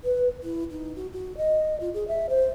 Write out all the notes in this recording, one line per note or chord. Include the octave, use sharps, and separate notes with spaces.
B4
E4
D#4
F#4
F#4
D#5
F4
G#4
E5
C5